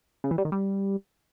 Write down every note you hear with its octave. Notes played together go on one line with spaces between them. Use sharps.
C#3
E3
G3
D#3
G3